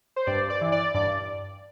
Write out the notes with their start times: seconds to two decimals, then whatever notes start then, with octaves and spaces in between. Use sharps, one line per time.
0.16 C5
0.27 G2 D5
0.50 D5
0.61 E3
0.72 D5
0.94 G2 D5